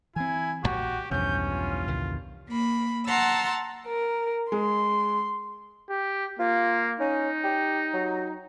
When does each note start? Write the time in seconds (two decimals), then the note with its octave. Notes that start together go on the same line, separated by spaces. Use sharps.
0.16 E3 C4 E4 G#5
0.64 D#1 A#1 F#4 G4
1.11 B1 E2 G2 F3 C#4 G6
1.51 F4
1.88 C2 D#3
2.49 A#3 B5
3.06 F#5 A5 A#5 C6 E6
3.87 A#4
4.52 G#3 C6
5.89 G4
6.39 A#3 F4
7.00 C#4 D#4
7.44 G4
7.94 F#3